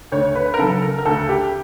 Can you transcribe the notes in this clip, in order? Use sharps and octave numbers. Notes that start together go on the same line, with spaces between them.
D2 C#5
B4
A#4
C#3 F#3 A4
A#4
A#4
D2 A4
G4